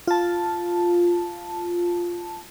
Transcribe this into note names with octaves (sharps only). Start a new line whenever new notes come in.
F4 A5